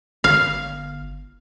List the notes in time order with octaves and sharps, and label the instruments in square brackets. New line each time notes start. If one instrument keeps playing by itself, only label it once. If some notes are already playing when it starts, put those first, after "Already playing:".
[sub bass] G1 [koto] F5